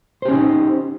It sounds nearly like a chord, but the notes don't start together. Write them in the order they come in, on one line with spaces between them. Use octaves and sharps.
C5 G4 C#4 D#4